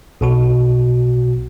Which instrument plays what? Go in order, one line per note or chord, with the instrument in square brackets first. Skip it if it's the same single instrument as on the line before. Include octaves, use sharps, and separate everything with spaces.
[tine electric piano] B1 B2 F#4